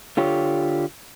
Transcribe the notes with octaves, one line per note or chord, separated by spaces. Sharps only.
D3 F4 G4 C#5